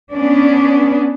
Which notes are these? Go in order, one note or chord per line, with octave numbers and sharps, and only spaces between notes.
B3 C#4 D4